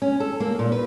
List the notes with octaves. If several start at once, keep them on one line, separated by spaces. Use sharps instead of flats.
C#4
A4
A#3
A#2
B4